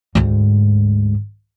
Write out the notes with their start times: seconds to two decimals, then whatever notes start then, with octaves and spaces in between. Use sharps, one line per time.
0.15 D2 G#2